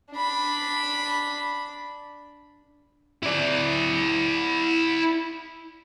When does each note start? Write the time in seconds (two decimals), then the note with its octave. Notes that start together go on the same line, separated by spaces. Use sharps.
0.12 D4 B5
3.23 E4 D5